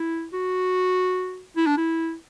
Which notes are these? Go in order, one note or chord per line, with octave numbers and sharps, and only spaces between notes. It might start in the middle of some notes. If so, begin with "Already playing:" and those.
Already playing: E4
F#4
E4
D4
E4